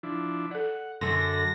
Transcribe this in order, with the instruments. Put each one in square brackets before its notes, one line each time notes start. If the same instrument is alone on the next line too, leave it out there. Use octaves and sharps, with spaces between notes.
[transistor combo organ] F3 D4 E4
[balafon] A4 D5 [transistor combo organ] F#5
[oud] F#2 D3 [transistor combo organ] A5 [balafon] C6 [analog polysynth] A#6